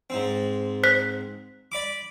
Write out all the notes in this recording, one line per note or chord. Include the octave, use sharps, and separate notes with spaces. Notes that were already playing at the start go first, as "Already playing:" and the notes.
G#2 C4
C5 F#6 B6
D5 B5 D6